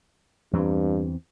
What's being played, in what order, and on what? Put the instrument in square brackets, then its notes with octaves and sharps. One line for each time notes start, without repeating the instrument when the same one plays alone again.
[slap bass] E2 E3 C4 [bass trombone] G2